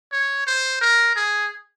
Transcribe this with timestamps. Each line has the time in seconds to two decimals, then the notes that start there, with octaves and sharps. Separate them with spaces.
0.12 C#5
0.46 C5
0.81 A#4
1.16 G#4